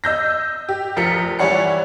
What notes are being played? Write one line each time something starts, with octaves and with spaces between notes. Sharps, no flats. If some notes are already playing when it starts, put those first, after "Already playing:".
D#5 E6 G6 A#6
G4
F1 F3 A#4 A#5 B6 C#7
E3 G3 C#5 D5 F#5 C#7